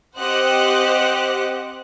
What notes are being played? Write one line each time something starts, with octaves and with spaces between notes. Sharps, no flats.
C4 G4 C5 D#5 F#5 F#6